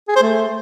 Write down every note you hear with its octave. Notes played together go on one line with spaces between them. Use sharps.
G#4
C5
A3